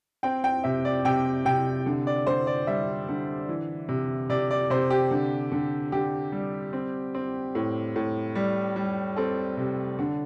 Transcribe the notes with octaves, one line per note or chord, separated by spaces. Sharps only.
C4 G5
G5
C3 E5
D5
C3 G5
C3 G5
D3
D5
D3 C5
D5
G3 E5
D3
E3
C3
C3 D5
D5
C3 C5
G4
D3
D3
D3 G4
G3
C4
C4
A2
A2
G3
G3
C4 A4
C3
D3